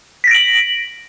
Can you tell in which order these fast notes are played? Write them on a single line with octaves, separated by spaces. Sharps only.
B6 A#6 D7 F#7